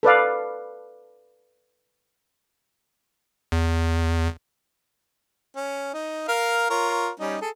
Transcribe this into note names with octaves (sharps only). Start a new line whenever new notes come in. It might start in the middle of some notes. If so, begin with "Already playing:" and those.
A4 B4 D5 F5
E2
C#4
D#4
A#4 F5
F4 A#4 C#5
G3 C#4 D#4
G#4 A4